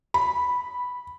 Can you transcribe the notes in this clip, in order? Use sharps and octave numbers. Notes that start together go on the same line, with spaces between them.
B5